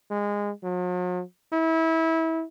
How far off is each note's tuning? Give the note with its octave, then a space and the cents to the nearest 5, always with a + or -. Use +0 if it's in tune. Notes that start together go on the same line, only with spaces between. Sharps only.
G#3 -20
F#3 -45
E4 -25